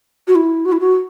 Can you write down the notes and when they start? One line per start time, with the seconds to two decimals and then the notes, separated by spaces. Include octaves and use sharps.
0.27 F#4
0.35 E4
0.65 F#4
0.72 E4
0.80 F#4